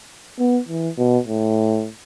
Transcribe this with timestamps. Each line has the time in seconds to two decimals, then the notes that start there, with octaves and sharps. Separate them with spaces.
0.39 B3
0.69 E3
0.98 B2
1.27 A2